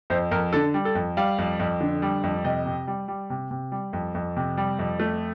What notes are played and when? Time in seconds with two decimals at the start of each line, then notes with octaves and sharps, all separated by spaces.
0.10 F2 C5
0.31 F2 A#4
0.53 D3 A4
0.74 G3
0.85 A4
0.95 F2
1.17 G3 F5
1.38 F2
1.59 F2
1.81 D3
2.02 G3
2.23 F2
2.44 C3 D#5
2.66 C3
2.87 G3
3.08 G3
3.30 C3
3.51 C3
3.72 G3
3.93 F2
4.15 F2
4.37 C3
4.57 G3
4.79 F2
5.00 A3